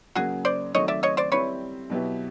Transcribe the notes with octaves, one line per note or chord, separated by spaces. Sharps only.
C#3 F#3 A#3 F#4 G#4
C5 D5
D#3 F#3 A3 C4 C#5 D#5
D5 E5
C#5 D#5
C5 D5
G3 C4 E4 B4 C#5
B2 F#3 B3 E4 G4